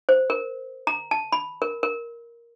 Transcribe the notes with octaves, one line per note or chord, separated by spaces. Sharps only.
C5
A#4
A#5
A5
B5
A#4
A#4